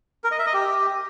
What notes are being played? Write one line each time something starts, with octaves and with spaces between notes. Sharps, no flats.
A#4
D#5
E5
D#5
G4